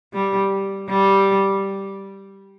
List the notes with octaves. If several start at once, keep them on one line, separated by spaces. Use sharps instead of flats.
G3
G3